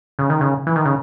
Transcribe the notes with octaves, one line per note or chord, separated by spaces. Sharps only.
C#3
D#3
C#3
E3
D#3
C#3